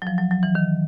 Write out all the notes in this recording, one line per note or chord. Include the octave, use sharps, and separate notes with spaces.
F#3
F3
F#3
F#3
E3
D#3